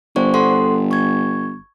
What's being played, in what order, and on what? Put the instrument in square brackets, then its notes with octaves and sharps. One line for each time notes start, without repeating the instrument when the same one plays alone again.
[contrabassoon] G1 [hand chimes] C5 D5 C#6
[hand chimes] A4 F#5 C6
C#6 G#6